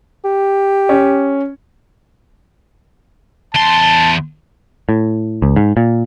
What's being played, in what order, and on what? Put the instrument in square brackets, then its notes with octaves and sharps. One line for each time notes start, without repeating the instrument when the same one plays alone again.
[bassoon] G4
[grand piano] C#4
[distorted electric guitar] E2 C6 [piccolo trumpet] A5
[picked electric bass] A2
C#2
G#2
A#2